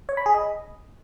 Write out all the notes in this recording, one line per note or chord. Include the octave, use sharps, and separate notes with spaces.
C#5
B5
G#4
D#5